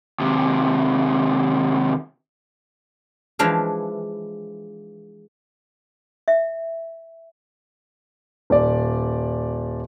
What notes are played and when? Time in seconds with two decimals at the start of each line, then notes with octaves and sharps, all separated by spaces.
0.20 D#2 C3
3.39 E3 F3 G#3 D4 F5
6.28 E5
8.50 D#1 D5